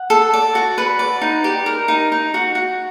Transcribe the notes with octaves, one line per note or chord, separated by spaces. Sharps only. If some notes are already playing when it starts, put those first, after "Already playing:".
Already playing: F#5
A4
D5
F#4
B4
D5
D#4
G4
A#4
D#4
D#4
F#4
F#4